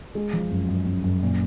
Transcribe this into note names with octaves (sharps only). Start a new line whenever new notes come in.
G#3
F3
F#2
F#2
F#2
F#2
A#2